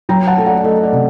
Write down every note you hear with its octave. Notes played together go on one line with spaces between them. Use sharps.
F#3 G5 A#5
F#5 A5
A3
D5 F#5
A3 D#5
D5
C3